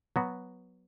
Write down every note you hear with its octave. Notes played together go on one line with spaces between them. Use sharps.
F#3 B3 F#4